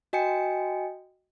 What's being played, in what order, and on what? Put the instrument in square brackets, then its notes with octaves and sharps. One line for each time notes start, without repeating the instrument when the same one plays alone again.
[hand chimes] F#4 D#5 G5 G#5 C#7